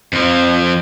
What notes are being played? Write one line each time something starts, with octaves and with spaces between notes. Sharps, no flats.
F2 F3